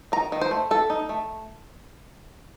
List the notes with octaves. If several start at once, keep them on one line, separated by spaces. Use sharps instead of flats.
D#3 A#5
D#3
C5
A3
A3 A4
D#4
A3